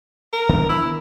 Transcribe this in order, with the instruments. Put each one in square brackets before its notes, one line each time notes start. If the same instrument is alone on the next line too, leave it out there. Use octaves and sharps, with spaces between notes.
[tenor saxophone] A#4
[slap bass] D#3 B3 D4
[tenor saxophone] E4